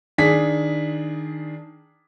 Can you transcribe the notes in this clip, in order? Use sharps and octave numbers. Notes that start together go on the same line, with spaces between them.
D#3 D4 G#4 B6